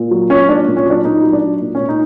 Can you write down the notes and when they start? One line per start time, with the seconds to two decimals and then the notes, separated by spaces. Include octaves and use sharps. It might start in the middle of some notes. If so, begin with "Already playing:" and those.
Already playing: A#2
0.11 F#3
0.30 F#3 C#4
0.49 A#2 D4
0.67 A#2
0.77 C#4
0.86 F#3 D4
1.04 A#2 D#4
1.23 F#3
1.33 D4
1.42 F#3
1.61 A#2
1.75 A#2 C#4
1.89 D#4